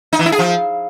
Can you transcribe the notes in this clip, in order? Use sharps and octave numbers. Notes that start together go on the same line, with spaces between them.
D#4
E3
E4
G#4
F3